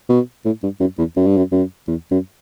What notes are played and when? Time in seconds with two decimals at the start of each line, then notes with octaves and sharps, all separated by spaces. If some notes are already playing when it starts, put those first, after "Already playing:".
0.09 B2
0.45 A2
0.63 G2
0.80 F#2
0.98 E2
1.16 F#2
1.27 G2
1.37 F#2
1.52 F#2
1.87 E2
2.11 F#2